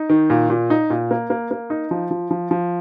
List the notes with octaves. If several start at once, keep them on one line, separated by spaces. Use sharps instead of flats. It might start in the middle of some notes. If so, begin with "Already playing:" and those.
Already playing: D#4
D#3
A#2
A#2
D#4
A#2
A#3
A#3
A#3
D#4
F3
F3
F3
F3